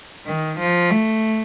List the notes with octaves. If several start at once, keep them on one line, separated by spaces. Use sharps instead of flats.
D#3
F3
A3